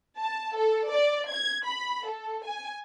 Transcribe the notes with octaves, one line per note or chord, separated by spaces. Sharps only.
A5
A4
D5
G#6
B5
A4
G#5